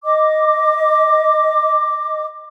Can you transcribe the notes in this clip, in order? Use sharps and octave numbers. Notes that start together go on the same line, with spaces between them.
D#5 D6